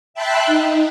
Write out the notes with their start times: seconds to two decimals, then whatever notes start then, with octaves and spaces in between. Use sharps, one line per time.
0.14 E5 G5 A5 B5 C6 F#6
0.46 D#4